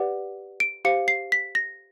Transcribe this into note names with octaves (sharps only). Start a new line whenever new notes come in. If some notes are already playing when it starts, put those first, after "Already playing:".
Already playing: G4 B4 D5 F#5
D7
G4 C5 F5 C#7
C7
B6
A#6